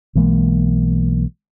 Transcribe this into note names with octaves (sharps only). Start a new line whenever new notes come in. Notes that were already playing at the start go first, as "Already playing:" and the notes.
B1 E3 G#3 A#3